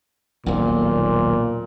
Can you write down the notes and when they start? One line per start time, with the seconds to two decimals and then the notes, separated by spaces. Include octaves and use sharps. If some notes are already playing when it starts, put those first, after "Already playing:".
0.46 D#1 B1 A#2